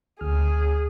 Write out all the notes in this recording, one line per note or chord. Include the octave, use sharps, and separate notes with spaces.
D2 G#4 F6